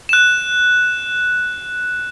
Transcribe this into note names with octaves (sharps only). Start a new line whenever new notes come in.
F#6 E7